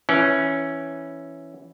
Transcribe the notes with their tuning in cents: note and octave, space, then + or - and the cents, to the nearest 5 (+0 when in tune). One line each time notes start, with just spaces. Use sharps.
E3 +0 C#4 +0